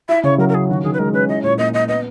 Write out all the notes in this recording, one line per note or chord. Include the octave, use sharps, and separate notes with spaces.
E4 E5
C#3 C#5
F#3 A#4
A#4
C#4 G#4
D#3 F#4
D#3 G#4
B4
G#3 A#4
C#4 B4
E4 D#5
A#2 C#5
A#3 D#5
C#4 D#5
B3 D#5